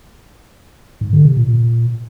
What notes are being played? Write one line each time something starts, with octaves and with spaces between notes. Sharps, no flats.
G#2
D3
C3
A#2
A#2